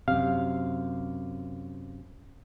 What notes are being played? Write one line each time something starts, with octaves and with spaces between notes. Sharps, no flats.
F#2 C3 F5